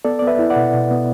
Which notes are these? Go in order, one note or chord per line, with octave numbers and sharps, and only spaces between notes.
B3 A4 D5
D5
B3
B4 E5
E4
D5 F#5
B2
B2
B3